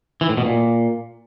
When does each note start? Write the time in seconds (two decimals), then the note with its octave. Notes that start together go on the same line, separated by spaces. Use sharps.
0.21 E3
0.29 A2
0.37 B2
0.46 A#2